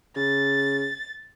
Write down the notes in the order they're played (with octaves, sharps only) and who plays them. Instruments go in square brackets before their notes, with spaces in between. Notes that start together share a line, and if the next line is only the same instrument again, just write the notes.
[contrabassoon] C#3 [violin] A6